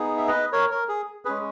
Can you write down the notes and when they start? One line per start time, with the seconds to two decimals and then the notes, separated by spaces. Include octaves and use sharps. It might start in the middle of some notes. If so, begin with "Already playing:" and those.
Already playing: B3 D#4 G#4
0.17 E5
0.28 B4 D#5
0.53 A#4 C#5
0.71 A#4
0.89 G#4
1.25 G#3 C#4 G#4 B4